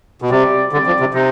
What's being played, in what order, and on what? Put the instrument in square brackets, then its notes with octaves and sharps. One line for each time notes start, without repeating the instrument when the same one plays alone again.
[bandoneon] B2
[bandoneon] C3 [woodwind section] G3 C4 G4 D5
[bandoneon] D3 [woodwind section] G3 C4 G4 D5
[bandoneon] F3
C3
[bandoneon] C3 [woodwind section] D#4